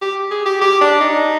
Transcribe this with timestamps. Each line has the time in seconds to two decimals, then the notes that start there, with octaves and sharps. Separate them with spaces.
0.02 G4
0.31 G#4
0.46 G4
0.61 G4
0.81 D4
1.00 D#4